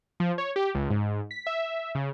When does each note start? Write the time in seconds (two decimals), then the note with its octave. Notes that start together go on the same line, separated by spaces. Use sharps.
0.20 F3
0.38 C#5
0.56 G4
0.75 C#2
0.90 G#2
1.31 B6
1.47 E5
1.95 C#3